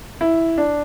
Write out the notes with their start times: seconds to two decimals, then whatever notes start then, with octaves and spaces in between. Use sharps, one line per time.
0.21 E4
0.58 D4